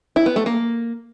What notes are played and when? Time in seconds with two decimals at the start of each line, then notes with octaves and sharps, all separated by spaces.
0.16 E4
0.26 B3
0.36 A3
0.46 A#3